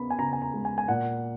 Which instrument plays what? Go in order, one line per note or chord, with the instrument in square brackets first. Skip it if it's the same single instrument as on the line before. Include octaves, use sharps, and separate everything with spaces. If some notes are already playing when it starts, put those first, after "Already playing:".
Already playing: [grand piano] C#3 B3 B5
G#5
C#3 A#5
G#5
A#5
G#3
G#5
G#5
A#2 F#5